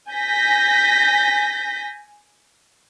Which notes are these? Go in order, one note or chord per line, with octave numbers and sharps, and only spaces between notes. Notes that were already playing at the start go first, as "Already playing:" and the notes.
G#5 G6 A#6 B6